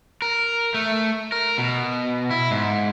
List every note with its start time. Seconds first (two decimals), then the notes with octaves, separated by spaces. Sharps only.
0.22 A#4
0.74 A3
1.32 A#4
1.58 B2
2.31 E4
2.51 G#2